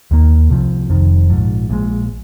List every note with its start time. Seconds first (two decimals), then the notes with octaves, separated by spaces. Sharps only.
0.11 D#2 D#3 A#3
0.50 C2 C3 F3
0.90 F1 F2 D#3
1.30 A#1 G#2 F3
1.69 A#1 A#2 F3 G#3